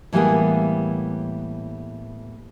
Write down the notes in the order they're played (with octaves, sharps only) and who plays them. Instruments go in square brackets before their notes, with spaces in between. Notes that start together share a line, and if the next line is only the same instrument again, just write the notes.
[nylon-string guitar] A2 E3 G3 A#3 B3 G#4